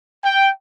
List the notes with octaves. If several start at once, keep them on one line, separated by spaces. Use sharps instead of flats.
G5